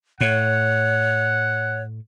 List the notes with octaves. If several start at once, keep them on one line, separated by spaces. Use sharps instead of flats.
A2 C#5 F#5